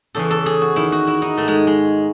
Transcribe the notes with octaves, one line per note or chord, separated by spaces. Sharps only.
E2 C#3 E3 A4
A4
G#4
F#4
E2 D#3 E4
F#4
E4
D#4
G#2 D#3 A3
G#3
G#3